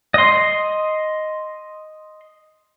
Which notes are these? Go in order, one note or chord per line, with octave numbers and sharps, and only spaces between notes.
D#5 C6